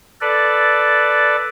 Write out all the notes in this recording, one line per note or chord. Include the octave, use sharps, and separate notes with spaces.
A4 B4 D5